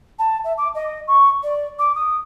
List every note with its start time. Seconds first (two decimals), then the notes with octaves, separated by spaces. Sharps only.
0.19 A5
0.44 E5
0.58 D6
0.75 D#5
1.07 C#6
1.43 D5
1.79 D6
1.95 D#6